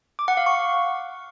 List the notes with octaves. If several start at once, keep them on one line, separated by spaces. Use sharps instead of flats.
D6
F#5
F5
C#6